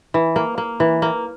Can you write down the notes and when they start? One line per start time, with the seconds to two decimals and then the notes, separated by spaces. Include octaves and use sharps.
0.14 E3
0.36 A#3
0.58 A#3
0.80 E3
1.02 A#3